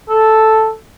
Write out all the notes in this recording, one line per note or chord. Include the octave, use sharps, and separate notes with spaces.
A4